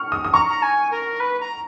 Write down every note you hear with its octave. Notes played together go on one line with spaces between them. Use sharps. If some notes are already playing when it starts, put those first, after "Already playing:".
Already playing: C#6 F6
D#6
D#6
A#5 C#6
A#5
G#5
A#4
B4
A#5